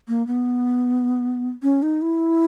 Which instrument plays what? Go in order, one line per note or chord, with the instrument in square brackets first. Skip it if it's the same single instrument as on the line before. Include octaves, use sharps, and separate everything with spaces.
[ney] A#3
B3
C#4
D#4
E4